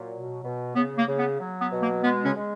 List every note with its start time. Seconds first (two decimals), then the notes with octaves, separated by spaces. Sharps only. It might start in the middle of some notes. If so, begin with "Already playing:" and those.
Already playing: A#2 F#3
0.12 B2
0.44 B2
0.75 C#3 B3
0.97 A#3
1.07 C#3
1.18 B3
1.40 F#3
1.61 B3
1.72 B2
1.83 A#3
2.03 G#3 B3
2.24 C#3 C#4
2.35 G#3